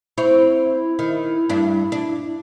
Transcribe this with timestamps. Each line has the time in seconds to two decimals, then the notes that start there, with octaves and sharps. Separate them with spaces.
0.18 C4 E4 C#5
0.99 D#3
1.50 G2 D4
1.92 D4